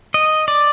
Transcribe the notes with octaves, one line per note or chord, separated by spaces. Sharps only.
D#5
D5